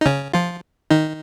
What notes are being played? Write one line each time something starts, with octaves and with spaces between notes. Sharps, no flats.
D#4
C#3 C#4
F3 F4
D#3 D#4